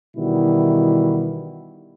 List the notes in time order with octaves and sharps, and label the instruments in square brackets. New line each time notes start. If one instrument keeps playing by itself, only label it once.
[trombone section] B2 D#3 E3 G3 E4 F#4